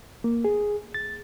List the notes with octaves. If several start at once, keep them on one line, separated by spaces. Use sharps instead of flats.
A#3
G#4
A6